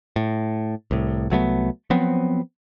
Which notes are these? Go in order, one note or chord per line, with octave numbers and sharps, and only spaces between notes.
A2
C2 A2
C2 F#3 A3 B3
F3 F#3 B3 C4